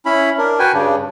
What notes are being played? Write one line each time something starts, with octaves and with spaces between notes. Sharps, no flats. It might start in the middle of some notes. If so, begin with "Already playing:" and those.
C#4 E4 B5
D4 A#4
F#4 B4 G5 G#5
G2 C#3 D4